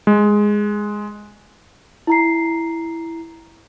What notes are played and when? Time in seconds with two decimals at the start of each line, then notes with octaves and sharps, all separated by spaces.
0.07 G#3
2.07 E4 A#5 C7